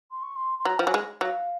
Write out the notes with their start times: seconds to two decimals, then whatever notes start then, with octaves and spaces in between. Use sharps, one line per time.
0.11 C6
0.22 C#6
0.35 C6
0.58 C6
0.65 F#3 A#5
0.78 F3 F#5
0.84 F#3 G#5
0.94 G#3
1.21 F#3 F5